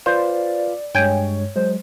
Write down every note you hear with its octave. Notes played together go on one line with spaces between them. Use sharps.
F4 B4 C5 D5 F5
G2 G#3 C#5 G5 G#5
F#3 G#3 C5